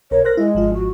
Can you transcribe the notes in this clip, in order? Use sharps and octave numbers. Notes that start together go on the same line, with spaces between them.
B1 A#4 C#5
A#4 C5 F#6 A#6
G#3 E4
G#1 F3 F4
F#4